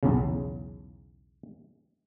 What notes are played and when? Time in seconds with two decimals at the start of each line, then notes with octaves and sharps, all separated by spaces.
0.03 B1 E2 C#3